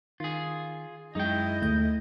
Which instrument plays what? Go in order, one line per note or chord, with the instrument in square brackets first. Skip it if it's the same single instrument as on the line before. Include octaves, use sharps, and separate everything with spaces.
[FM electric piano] D#3 [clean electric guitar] F4 G#4
[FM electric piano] F#2 G#3 [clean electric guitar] D#4 G5 [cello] E4 D#5
[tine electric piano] D2 A3 G6